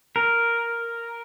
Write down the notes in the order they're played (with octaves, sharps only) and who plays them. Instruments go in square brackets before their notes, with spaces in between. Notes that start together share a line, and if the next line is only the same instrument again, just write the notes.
[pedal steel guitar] A#4